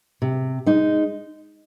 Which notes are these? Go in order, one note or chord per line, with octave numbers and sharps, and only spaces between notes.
C3
G#3 D#4